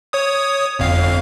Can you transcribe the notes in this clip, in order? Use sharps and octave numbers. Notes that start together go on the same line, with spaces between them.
C#5 D#6
G1 F2 F5